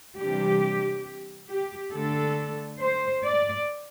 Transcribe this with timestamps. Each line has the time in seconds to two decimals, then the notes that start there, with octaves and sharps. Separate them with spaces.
0.18 C3 E3 G3 D4 G4
1.49 G4
1.93 D3 A3 D4 A4
2.80 C5
3.23 D5